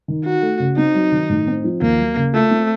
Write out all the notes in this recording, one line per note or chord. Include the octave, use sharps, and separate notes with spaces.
D#3
D#4 F#4
A3
C#3
C4 D#4
F#3
D#3
A2
C4
F3
D#2 A#3
F#3
C#3
A3 F4
C4